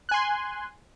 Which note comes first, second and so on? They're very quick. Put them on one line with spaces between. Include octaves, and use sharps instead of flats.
F#6 G#5 C6